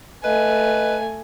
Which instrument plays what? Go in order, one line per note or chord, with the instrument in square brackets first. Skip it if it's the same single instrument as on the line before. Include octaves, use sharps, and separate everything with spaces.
[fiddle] A3 G#5 [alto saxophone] B4 [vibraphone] D#5